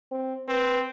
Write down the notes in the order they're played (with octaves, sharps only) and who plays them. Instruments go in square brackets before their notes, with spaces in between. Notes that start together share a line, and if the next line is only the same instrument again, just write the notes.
[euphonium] C4
[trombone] C4 [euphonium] B4